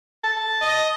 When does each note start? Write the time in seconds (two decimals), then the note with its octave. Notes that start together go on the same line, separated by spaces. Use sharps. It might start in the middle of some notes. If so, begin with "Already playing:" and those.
0.24 A5
0.62 D#5